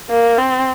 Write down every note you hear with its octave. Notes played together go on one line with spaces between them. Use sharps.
A#3
C4